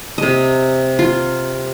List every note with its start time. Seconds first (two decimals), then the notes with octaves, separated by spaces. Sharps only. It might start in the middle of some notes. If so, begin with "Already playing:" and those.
0.18 C3 D#5
0.99 F4